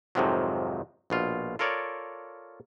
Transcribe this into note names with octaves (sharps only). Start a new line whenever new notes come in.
F2 G#2 C3 D#3 F3 F#3
A#1 B2 F4
F4 A4 A#4 C#5 D5